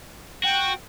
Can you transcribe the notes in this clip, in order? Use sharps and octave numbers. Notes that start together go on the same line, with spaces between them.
F#4 G5